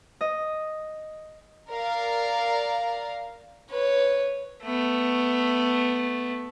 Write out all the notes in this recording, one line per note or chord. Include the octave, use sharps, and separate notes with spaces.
D#5
A#4 D5 F5
B4 C#5
A3 B3